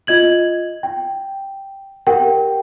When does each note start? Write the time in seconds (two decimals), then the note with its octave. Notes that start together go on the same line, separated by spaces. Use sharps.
0.07 F4 D#5 G#6 F#7
0.83 G5
2.07 G4 A#4 F#5 G5